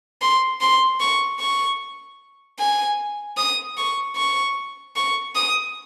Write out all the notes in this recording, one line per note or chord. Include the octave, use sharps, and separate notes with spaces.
C6
C6
C#6
C#6
G#5
D#6
C#6
C#6
C#6
D#6